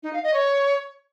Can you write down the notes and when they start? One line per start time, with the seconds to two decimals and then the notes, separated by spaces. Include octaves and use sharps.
0.03 D#4
0.13 F5
0.23 D#5
0.34 C#5